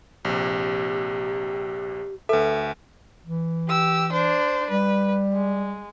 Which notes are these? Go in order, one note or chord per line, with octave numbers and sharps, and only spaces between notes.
A#1 C3 G4
D2 A4 B4 E5
E3
G4 E6
D4 C5
G3 B4
G#3